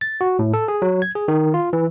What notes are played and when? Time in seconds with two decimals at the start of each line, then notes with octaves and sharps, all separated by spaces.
0.01 A6
0.21 F#4
0.39 A2
0.54 A4
0.68 G#4
0.82 F#3
1.02 G#6
1.15 G#4
1.28 D#3
1.54 F4
1.73 E3